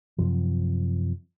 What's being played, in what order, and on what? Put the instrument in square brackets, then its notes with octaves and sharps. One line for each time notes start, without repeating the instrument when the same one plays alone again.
[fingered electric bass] F#2 C3 F3